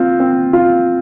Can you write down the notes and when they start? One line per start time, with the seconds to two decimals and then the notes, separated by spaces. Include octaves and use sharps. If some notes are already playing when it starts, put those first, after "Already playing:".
Already playing: C4 F4
0.20 C4
0.53 F4